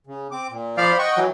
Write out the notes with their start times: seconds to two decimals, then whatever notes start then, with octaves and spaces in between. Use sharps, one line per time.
0.07 C#3
0.31 C4 D6
0.50 A#2
0.77 F3 C5 D5 F5 B5
0.99 D#5 F#5 G5 C#6
1.17 E3 F#3